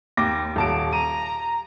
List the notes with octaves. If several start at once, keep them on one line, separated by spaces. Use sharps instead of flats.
D#2 D6 A#6
D#1 A5 D7
A#5 D#7